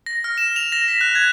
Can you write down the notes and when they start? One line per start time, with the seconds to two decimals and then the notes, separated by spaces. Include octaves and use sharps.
0.06 A#6
0.24 F6
0.38 E7
0.56 F7
0.72 A#6
0.88 B6
1.01 F#6
1.15 G#6